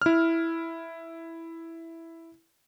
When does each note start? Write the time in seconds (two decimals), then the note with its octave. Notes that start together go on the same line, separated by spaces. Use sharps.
0.02 E4 F6